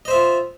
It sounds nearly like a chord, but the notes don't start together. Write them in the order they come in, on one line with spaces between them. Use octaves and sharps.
D#5 C5 E5 F4